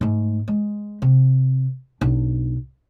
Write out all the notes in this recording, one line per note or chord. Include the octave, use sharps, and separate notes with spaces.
G#2 A3
G#3
C3
B1 D4